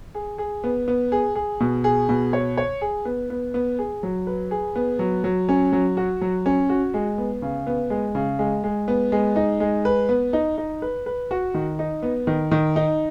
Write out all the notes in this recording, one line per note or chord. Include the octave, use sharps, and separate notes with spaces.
G#4
G#4
B3
B3
G#4
G#4
B2
G#4
B2
C#5
C#5
G#4
B3
B3
B3
G#4
F#3
B4
G#4
B3
F#3
F#3
C#4
F#3
F#4
F#3
C#4
F#4
G#3
B3
C#3
B3
G#3
C#3
G#3
G#3
B3
G#3
D#4
G#3
B4
B3
D#4
D#4
B4
B4
F#4
D#3
D#4
B3
D#3
D#3
D#4